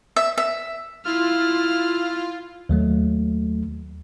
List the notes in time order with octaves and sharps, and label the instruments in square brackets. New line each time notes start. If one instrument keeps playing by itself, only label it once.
[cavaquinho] E5
E5
[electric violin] E4 F6 [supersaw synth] F4
[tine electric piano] D#2 F#3 A3